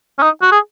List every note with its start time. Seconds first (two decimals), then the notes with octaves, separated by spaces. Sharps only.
0.18 C#4
0.22 D#4
0.42 F#4
0.52 G#4